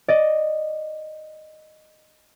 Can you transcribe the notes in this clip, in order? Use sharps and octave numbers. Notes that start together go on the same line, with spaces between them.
D5 D#5